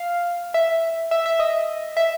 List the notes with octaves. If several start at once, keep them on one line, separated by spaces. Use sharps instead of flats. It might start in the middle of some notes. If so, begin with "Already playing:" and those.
Already playing: F5
E5
E5
E5
D#5
E5